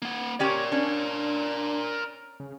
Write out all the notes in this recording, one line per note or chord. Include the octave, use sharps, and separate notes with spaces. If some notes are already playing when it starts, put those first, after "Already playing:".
A#3 F#5
C#4 G4 A#4 C#5 D5
C#4 D4
C#3